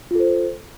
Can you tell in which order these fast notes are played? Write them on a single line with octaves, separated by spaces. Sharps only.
F4 A4 C5